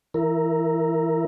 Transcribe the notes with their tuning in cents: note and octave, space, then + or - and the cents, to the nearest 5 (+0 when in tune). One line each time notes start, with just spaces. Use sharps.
E3 +0 E4 +0 A#4 +0